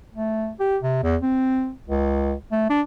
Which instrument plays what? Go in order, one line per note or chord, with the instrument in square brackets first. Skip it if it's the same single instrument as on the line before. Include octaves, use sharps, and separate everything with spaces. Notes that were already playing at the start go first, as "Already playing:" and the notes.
[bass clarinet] A3
G4
C3
E2
C4
C#2
A3
D4